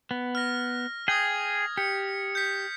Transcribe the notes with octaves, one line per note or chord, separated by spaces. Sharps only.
B3
F6 A#6
G#4 G5 D#6 G#6 A#6
G4 C#7
G6 B6